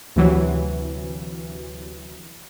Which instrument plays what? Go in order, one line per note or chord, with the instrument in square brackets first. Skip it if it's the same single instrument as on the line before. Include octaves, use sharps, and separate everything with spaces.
[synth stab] D2 C3 E3 F#3